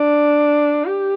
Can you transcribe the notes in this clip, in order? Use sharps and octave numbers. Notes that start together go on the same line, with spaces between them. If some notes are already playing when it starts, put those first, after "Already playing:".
Already playing: D4
G4